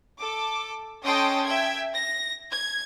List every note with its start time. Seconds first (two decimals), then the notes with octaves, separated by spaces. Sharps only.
0.19 A4 D6
1.05 C#4 A4 D#5 G5 C6 D#6
1.45 E5 G5 G#6
1.93 A#6
2.53 G#6